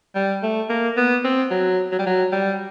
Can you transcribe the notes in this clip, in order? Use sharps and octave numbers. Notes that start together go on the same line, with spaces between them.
G3
A3
A#3
B3
C4
F#3
F#3
G3
F#3
G3